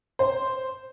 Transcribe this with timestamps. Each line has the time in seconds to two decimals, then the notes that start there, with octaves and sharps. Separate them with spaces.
0.19 C5